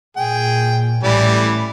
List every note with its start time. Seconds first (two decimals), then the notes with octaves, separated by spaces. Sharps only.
0.17 A#2 G#4 G5
1.03 A1 A2 E3 G3 A3 D5